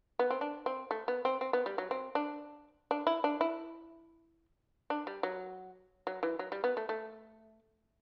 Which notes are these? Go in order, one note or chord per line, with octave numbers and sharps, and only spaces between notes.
B3
C4
D4
C4
A3
B3
C4
C4
B3
G3
F#3
C4
D4
D4
E4
D4
E4
D4
G3
F#3
F#3
E3
F#3
G3
B3
A3
A3